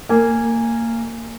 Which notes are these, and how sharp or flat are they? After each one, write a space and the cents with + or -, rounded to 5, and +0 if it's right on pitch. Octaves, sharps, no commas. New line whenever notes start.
A#3 -20 G#5 -10